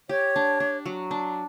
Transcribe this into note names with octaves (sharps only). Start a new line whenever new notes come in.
G4 C#5
D4
D4
F#3
D4